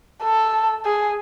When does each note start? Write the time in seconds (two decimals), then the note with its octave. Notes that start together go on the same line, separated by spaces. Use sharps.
0.23 A4
0.85 G#4